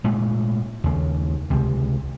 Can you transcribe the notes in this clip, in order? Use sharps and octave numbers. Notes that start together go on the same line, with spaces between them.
A#2 G#3 A3
D#2 C#3
C#2 C3